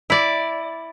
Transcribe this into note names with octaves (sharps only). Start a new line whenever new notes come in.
E4 D5